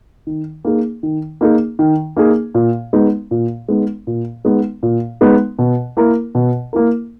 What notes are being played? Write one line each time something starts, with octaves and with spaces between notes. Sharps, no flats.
D#3
A#3 D#4 G#4
D#3
A#3 D#4 G#4
D#3
A#3 D#4 G#4
A#2
G#3 B3 D#4
A#2
G#3 B3 D#4
A#2
G#3 B3 D#4
A#2
G#3 B3 D#4
B2
A#3 E4 A#4
B2
A#3 E4 A#4